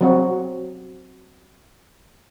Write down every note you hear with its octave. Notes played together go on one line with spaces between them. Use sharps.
F#3 C4 F#4